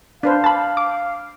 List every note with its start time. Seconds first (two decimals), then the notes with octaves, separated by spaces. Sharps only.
0.23 D4 B4 C5 F5
0.44 A5 B5
0.77 D6